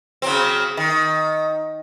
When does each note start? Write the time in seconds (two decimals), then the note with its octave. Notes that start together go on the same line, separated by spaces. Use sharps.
0.22 C#3 F#3 C4
0.77 D#3